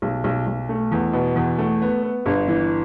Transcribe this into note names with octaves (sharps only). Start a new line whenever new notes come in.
B1
B1
B1
A3
E2
B2
E2
A3
B3
B3
G1
E3